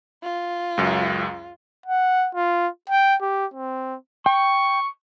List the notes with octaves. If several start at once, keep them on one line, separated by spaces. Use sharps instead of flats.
F4
C#2 F#2
F#5
F4
G5
G4
C4
G5 C#6